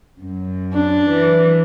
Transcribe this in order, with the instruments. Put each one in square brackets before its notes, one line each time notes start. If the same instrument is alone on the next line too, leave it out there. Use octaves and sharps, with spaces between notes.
[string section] F#2
[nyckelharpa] D4
[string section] E3